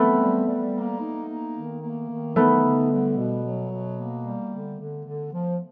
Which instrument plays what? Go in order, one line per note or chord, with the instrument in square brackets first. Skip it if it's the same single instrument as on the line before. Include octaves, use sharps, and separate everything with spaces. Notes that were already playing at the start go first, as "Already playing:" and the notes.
Already playing: [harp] A3 B3 [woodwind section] C4
[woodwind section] G3
G3
A#3
D#4
A#3
D#3
A#3
D#3
[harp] A3 B3 [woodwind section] D#4
[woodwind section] D3
G3
B2
F#3
B2
A#3
G3
D3
D3
D3
F3